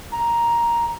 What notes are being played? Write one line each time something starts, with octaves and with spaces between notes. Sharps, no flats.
A#5